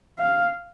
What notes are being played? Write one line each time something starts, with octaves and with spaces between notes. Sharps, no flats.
F5